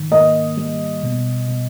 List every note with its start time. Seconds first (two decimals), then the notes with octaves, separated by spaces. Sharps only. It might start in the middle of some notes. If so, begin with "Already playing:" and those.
Already playing: G#2 D#3
0.11 A#3 D#5
0.57 G3
1.03 B2
1.48 B2